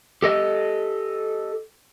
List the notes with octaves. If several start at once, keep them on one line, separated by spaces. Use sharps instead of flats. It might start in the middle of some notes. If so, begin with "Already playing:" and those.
G4 A4 D#5